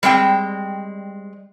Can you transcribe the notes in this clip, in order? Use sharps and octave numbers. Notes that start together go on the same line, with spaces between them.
G3 G#3 C4 G5